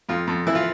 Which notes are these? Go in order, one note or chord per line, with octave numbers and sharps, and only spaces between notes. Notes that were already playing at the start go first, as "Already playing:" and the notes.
F2 F4
F2
E3 E4
F4